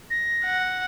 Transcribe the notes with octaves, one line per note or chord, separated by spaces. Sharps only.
A#6
F#5